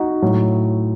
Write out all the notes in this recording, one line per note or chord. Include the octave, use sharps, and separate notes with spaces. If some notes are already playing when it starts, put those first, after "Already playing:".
Already playing: D#4 F#4
A2 F#3